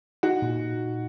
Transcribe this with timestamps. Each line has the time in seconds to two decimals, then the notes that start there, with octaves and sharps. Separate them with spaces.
0.23 D#4 F#4
0.42 A#2